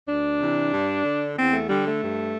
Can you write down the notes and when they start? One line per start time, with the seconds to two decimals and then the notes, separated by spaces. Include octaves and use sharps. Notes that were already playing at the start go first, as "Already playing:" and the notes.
0.08 D2 D4
0.40 C3 E3
0.73 G2
1.04 D3
1.37 E2 C4
1.52 A3
1.69 D3 G3
1.85 A3
2.01 G2